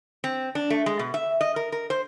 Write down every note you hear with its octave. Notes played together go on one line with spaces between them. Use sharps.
C4
D4
A3
G#3
B2
E5
D#5
A#4
A#4
C5